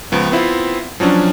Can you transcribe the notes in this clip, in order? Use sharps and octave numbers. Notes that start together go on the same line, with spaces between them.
C#2 F3 B3
B3 C4 E4 F4
F3 F#3 C#4 D4